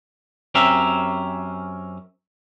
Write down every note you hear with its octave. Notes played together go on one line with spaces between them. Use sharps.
F#2 C4 C#4 G4 A#4 E5